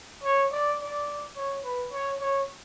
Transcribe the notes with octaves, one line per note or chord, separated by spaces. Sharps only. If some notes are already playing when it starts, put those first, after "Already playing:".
C#5
D5
D5
C#5
B4
C#5
C#5